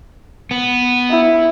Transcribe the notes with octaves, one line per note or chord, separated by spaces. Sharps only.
B3
E4